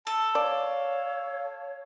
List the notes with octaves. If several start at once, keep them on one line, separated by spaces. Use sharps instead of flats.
A4 A5
C#5 D5 F5